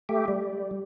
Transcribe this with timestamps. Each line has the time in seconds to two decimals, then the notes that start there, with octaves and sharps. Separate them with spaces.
0.09 A3 G4
0.28 G3